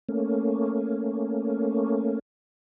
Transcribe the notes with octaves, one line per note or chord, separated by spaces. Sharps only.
A3 A#3 C#4